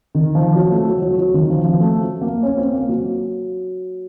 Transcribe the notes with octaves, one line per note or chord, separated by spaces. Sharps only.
D#3
F3
F#3
A3
F#3
F#3
F#3
D#3
F3
F3
A3
F#3
A#3
C#4
C4
A#3
F#3